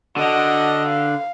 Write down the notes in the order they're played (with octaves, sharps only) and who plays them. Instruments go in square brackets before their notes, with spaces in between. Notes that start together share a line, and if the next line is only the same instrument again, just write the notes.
[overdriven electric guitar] D3 [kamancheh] F#4 D#5
[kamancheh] F5